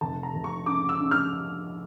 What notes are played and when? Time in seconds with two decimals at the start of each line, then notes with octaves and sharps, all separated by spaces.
0.01 F1 A5
0.23 A#5
0.34 F1
0.44 C#6
0.66 C#3 D6
0.89 E6
1.00 C#3
1.11 F6